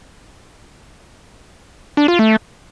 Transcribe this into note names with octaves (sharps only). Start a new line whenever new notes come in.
D4
F4
A3